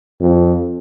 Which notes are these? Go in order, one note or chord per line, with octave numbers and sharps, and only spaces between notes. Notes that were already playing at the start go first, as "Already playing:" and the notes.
F2